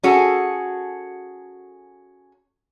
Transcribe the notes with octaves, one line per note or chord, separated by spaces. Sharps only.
C#4 F#4 G#4 A4